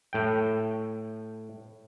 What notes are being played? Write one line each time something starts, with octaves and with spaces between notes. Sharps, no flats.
A2 G5